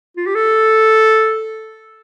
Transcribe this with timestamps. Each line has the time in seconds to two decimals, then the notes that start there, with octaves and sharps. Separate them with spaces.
0.17 F4
0.26 G4
0.35 A4